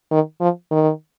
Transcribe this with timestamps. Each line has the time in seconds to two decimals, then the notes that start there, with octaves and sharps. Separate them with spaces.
0.11 D#3
0.41 F3
0.71 D#3